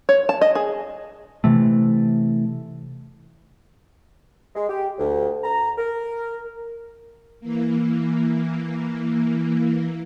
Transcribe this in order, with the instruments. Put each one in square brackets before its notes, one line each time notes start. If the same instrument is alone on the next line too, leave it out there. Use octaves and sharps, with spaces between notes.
[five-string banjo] C#5
A5
D#5
G#4
[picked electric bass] C3 E3 A3
[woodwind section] G#3
G4
D2
A#5
A#4
[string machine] E3 A#3